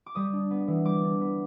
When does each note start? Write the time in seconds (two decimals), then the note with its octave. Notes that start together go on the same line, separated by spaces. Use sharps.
0.06 D6
0.15 G3 D#6
0.33 D4
0.51 B3
0.68 E3
0.85 G3 D6
1.04 D4
1.21 B3